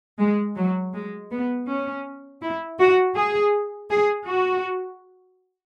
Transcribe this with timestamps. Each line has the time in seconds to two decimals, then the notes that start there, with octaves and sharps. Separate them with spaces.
0.20 G#3
0.57 F#3
0.94 G#3
1.31 B3
1.68 C#4
2.41 E4
2.79 F#4
3.16 G#4
3.90 G#4
4.27 F#4